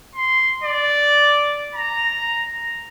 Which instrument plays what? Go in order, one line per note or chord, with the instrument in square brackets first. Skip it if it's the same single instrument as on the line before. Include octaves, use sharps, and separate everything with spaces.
[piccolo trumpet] C6
D5
A#5